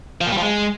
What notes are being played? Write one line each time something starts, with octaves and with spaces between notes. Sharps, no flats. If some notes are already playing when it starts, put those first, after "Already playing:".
F3
A#2
G3
F3
G#3